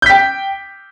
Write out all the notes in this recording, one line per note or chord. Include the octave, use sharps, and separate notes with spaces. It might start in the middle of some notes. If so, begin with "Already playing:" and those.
G5 G6 B6